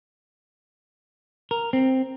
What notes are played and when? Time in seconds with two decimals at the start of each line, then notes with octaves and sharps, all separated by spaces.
1.51 A#4
1.73 C4